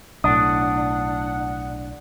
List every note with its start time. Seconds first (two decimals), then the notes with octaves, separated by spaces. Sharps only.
0.24 B1 A2 D4 F#5 D#6